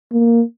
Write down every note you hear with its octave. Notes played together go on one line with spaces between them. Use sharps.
A#3